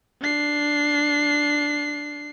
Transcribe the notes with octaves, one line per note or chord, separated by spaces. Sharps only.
D4 C7